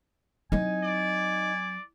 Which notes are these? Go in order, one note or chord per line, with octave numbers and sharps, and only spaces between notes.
F#3 C4 D#4 G#5
D5